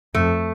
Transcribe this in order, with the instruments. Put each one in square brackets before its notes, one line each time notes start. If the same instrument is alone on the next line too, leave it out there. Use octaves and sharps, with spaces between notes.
[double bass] F2 [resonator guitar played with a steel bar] A3